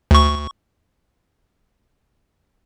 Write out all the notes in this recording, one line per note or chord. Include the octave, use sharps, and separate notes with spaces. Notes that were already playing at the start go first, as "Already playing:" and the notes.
D2 C#6